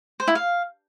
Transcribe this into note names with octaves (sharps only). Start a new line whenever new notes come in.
C5
E4
F5